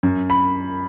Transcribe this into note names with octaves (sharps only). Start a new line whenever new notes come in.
F#2
B5